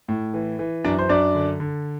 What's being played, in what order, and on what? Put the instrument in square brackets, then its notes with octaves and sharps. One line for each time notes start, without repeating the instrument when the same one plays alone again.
[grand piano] A2
E3
E3
F#2 D4 D5
C5
F#2 D4 D5
D3
D3